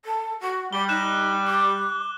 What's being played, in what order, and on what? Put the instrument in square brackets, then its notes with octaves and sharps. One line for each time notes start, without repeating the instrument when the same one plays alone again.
[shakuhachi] A4
F#4
[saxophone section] G3 [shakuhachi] D6 [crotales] G7
[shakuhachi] D#4 [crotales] F#6 E7
[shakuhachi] D6